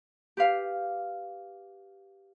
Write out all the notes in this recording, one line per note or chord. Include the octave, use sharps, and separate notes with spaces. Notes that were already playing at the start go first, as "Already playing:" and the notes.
G4 B4 F5